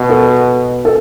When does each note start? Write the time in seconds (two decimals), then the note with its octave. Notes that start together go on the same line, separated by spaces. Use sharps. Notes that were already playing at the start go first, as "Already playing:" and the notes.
Already playing: B2
0.10 A4
0.85 A4